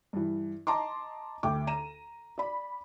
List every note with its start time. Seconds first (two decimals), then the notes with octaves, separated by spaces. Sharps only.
0.13 G2 E3
0.67 D#5 A5 A#5 C6 D6
1.43 D2 G5 D6
1.67 A#5 D#7 E7
2.38 D5 B5